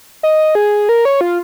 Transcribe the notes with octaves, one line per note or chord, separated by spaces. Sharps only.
D#5
G#4
A#4
C#5
F4